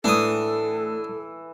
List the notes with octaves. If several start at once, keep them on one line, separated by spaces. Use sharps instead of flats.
A2 E3 D4 A4 D#6